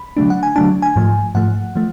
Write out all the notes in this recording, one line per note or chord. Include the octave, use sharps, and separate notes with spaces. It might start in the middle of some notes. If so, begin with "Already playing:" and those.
Already playing: B5
D3 F#3 A3 D4
F#5
G#5
D3 F#3 A3 D4 A5
G#5
G#2 F3 A3
G#2 F3 A3 F#5
F3 A3